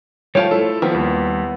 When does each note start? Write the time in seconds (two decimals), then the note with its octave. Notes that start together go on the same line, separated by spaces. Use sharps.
0.35 F3 G3 A3 F4 C#5 G5
0.51 A3 E4 A4
0.82 D#3 F3 G3 A#3 B3
0.94 D#2